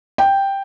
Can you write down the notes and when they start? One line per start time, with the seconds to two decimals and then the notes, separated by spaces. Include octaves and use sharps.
0.18 G5